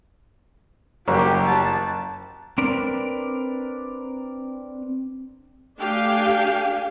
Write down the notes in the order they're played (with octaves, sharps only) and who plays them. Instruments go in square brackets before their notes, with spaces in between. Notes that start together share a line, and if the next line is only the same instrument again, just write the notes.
[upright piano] F#1 [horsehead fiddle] F#3 G4
[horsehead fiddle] A5
[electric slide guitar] C4 D4 A#4 B4 D5
[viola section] A3 D4 G4 F5 G5 G#5